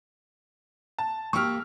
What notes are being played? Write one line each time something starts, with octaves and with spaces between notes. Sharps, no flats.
A5
A#3 G4 C#6 E6 F6